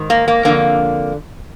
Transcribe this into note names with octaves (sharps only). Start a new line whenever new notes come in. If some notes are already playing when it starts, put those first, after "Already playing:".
Already playing: G#2 D#3
A#3
A#3
F2 D3 A#3